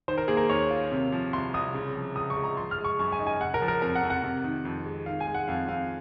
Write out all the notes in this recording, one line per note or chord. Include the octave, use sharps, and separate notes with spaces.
D#3 C5
A#4
A#3 G#4
A#4
D#2 C#5
F4
C3
F3
C2 C6
C2 D#6
C#3
F3
C#2 D#6
C#6
G#3
A#5
F3 C6
F6
G#3
C#6
F#2 C#6
G#5
D#4
G#5
C#3 F#5
A#4
F3
A#4
F2 A#4
F#5
F2
F#5
C3
D#3
F2
G#3
D#3 F5
G#5
G#3
F#5
F2 F5
F2 F5